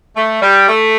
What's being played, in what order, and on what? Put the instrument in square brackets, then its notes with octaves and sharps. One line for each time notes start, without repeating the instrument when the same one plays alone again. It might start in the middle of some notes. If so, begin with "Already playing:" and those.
[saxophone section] A3
G3
A3